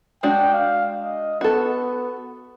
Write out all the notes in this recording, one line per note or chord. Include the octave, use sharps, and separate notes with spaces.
G#3 D4 F#4 G5
F5
D#5
B3 F#4 A4